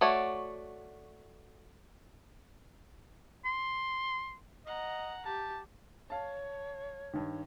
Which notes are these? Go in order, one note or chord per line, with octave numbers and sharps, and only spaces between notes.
A3 F#4 C#5 D5
C6
D#5 F#5 A#5
G4 A5
C#5 F5 A5
G2 D#3